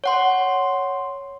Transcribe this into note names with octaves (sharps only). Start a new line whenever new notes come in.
C#5 F#5 C6